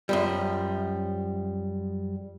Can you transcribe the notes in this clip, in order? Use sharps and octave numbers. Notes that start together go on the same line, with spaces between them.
F#2 F3 G3